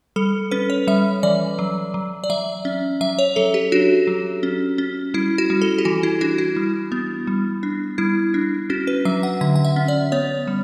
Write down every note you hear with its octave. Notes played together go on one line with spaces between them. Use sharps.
G3 A4
C#4 B4
C#5
G3 E5
E3 D5
F#3
F#3
D5
F#3 E5
C#4
F#3 E5
C#5
F#3 A4
G4
D4 F#4
F#3
C#4
C#4
G3 E4
F#4
G3
A4
G4
E3 F#4
E4
D4 F#4
E4
G3
B3
G3
D4
G3 E4
D4
C#4 F#4
B4
F#3 E5
F#5
D3 F#5
F#5
E5
C#4
D5
B3 C#5
G3